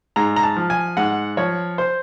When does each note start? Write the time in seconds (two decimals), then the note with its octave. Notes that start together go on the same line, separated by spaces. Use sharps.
0.16 G#2 A#5
0.36 A#5
0.43 A5
0.57 F3
0.70 G#5
0.97 G#2 F#5
1.37 F3 C#5
1.78 C5